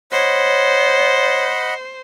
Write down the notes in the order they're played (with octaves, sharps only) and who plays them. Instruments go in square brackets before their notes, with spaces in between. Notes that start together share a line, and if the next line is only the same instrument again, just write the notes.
[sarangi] C5 [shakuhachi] C#5 [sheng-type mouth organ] D#5 F#5 B5